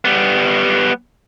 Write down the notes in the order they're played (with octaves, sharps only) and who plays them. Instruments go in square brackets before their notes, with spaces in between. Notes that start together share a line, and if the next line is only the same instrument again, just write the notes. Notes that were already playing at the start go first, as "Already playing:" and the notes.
[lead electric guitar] G3 B3